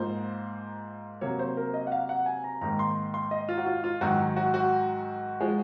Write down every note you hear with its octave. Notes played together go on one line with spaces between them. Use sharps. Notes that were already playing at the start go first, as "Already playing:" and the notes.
Already playing: G#2 F3 A#3 C5
C3 F#3 A#3 C#5
C5
A#4
D#5
F#5
F5
F#5
G#5
A#5
G#2 D#3 A#3 A#5
C6
C6
D#5
F4
F#4
F4
F4
G#2 D#3 F#3 F#4
F#4
F#4
F3 G#3